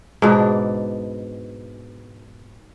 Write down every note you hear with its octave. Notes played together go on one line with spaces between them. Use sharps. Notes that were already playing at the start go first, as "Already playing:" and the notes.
G#2 B2 D4